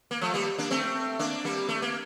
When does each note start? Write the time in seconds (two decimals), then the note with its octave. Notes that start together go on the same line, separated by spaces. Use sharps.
0.11 A#3
0.21 F3 A3
0.34 G3 A#3
0.58 A#3 D4
0.71 A3 C4
1.19 A#3 D4
1.45 G3 A#3
1.69 A3
1.82 A#3